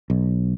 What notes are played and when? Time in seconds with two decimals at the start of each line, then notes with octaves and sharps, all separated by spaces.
0.10 B1